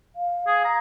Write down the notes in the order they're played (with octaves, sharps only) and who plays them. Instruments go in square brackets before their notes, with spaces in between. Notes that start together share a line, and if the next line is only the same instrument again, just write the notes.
[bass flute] F5
[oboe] G#4
A#5